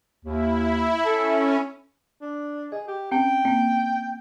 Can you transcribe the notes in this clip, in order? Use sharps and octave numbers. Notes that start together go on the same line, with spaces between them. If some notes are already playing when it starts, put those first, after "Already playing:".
D#2 E4
C#4 A4
D4
G#4 D#5
G4
C4 C#4 G5
A#3 C4